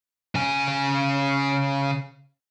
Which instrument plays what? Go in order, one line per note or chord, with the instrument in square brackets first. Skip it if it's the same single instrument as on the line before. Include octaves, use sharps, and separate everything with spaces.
[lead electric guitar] C#3 G#5